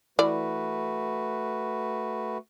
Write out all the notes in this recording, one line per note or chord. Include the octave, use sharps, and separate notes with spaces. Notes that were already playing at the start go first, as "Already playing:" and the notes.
E3 A3 F#4 B4 D5